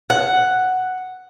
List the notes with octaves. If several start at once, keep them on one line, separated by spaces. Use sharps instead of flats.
F#5